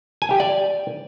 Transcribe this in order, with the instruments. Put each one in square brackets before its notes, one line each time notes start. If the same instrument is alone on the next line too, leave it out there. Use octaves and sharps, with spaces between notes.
[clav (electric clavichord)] G#5
G4
D5